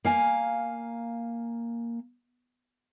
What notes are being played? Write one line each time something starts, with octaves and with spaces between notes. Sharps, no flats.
A#3 F5 G#5